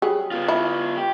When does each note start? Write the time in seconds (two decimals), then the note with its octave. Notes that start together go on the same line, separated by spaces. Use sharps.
0.02 F#3 G3 G#4
0.31 B3 F4
0.48 E4
0.97 G4